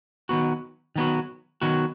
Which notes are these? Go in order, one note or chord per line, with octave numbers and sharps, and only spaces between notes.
D#3 F#3 B3 F#4
D#3 F#3 B3 F#4
D#3 F#3 B3 F#4